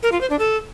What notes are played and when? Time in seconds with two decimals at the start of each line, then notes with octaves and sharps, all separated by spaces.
0.03 A#4
0.12 F4
0.21 C5
0.30 D4
0.39 A4